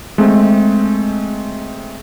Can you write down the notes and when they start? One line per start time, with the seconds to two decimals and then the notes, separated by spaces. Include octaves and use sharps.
0.18 G#3 A3 C4